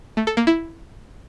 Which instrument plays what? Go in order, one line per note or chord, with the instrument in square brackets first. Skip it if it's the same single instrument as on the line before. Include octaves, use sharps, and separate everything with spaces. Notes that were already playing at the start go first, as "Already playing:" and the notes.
[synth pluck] A3
A4
A#3
E4